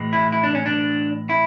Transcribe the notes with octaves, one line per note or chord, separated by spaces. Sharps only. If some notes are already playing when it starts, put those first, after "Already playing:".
Already playing: A2 E3 G#3
E4
E4
D4
C#4
D4
E4